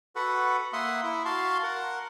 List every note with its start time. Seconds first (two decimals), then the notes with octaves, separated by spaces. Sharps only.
0.16 F#4 A4 B4 F#5
0.73 A#3 E5 F#5 C6 D#6
1.03 E4 E5
1.25 F#4 F5 A5 C6
1.63 A#4 F#5